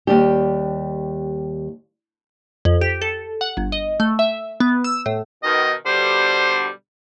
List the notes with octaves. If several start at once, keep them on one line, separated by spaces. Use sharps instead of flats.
D#2 G3 G4
F2
G4
A4
F#5
G1
D#5
A3
E5
B3
E6
A2
B2 D#3 D#5
B2 D3 G3 C5